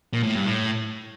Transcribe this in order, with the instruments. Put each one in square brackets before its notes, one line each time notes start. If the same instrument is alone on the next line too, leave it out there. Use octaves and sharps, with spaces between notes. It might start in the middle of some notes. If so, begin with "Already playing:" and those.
[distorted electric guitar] A#2
A2
G2
A2